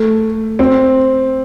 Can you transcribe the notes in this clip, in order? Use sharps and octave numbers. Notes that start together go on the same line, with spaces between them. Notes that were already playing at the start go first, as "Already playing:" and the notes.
Already playing: A3
C4